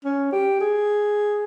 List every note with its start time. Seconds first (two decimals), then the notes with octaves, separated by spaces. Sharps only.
0.05 C#4
0.33 G4
0.61 G#4